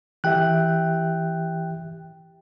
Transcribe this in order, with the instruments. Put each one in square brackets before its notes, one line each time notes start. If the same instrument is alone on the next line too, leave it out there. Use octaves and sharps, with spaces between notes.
[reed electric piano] E3 G4 E5 [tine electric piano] G5 F#6